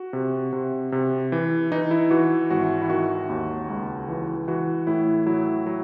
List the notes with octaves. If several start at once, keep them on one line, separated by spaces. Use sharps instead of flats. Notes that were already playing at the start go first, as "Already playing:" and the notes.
Already playing: F#4
C3
C3
C3
E3
E3 D#4
E4
E3 F#4
G#1 F#4
E4
D#3 F#4
D#2
C#2
E3
E3 F#4
A2 E4
F#3 E4
F#3